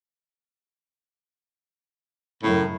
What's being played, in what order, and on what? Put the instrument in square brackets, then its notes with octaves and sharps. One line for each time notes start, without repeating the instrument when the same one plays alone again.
[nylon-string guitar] F#2 C#3 [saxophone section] A2